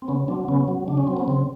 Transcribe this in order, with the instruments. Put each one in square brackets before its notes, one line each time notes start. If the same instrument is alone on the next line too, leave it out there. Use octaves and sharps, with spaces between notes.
[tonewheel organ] C4
C#3 B3 C#4
F#3 C4 D4
C#3 B3 C#4
F#3
C#3 D4
C#4
F#3 C4
B3 C#4
C#3 C4